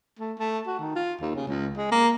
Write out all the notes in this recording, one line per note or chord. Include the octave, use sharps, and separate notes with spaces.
A3
A3
F#4
D#3
F4
D#2
C#3
C#2
G#3
A#3